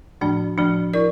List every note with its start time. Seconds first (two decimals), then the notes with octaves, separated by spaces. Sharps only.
0.21 A2 F3 A3 D4
0.58 A2 F3 A3 D4
0.94 E4 A#4 D5